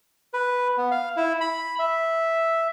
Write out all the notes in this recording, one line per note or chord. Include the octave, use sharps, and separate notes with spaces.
B4
B3
F5
E4
B5
E5